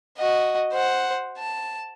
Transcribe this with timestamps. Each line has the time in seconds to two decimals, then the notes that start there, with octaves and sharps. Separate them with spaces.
0.18 F#4 D#5
0.73 C5 F#5
1.38 A5